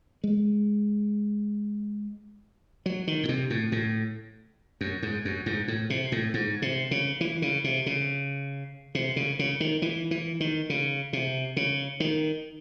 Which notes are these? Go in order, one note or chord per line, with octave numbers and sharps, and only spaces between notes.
G#3
F#3
D#3
A2
C3
A2
A2
F#2
G#2
F#2
G#2
A2
C3
A2
G#2
C3
C#3
E3
C#3
C3
C#3
C3
C#3
C#3
D#3
E3
E3
D#3
C#3
C3
C#3
D#3